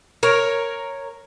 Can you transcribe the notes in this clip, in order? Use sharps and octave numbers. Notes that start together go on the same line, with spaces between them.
A#4 C#5